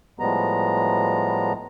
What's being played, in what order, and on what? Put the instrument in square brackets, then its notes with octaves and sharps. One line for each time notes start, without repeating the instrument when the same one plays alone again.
[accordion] A2 F3 G3 G#3 B3 A#5